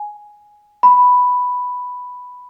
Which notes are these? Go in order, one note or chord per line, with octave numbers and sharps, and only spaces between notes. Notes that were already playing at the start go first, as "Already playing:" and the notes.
Already playing: G#5
B5